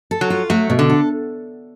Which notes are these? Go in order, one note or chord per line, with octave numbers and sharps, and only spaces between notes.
A4
F#3
F4
F#3 A3
B2
D3
A4